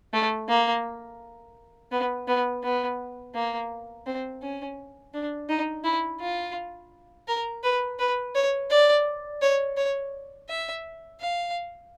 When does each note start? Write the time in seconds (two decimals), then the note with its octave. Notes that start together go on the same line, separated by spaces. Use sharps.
0.13 A3
0.48 A#3
1.91 B3
2.28 B3
2.63 B3
3.34 A#3
4.06 C4
4.42 C#4
5.14 D4
5.49 D#4
5.84 E4
6.21 F4
7.28 A#4
7.63 B4
7.99 B4
8.35 C#5
8.70 D5
9.42 C#5
9.77 C#5
10.49 E5
11.20 F5